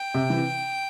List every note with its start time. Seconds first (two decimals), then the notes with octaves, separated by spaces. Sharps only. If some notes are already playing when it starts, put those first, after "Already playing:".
Already playing: G5
0.14 C3
0.30 E3